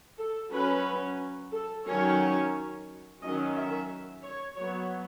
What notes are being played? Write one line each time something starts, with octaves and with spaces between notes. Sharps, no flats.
A4
F#3 C#4 B4
A4
D#3 F#3 C#4 C#5
D#3 F#3 C#4 D#5
E5
C#5
F#3 B3 C#5